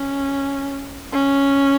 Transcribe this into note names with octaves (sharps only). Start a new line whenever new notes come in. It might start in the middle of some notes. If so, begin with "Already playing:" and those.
Already playing: C#4
C#4